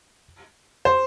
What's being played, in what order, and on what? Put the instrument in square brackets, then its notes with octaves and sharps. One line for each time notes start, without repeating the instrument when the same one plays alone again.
[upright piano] C5